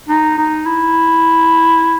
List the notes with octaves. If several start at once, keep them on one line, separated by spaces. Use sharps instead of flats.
D#4
D#4
E4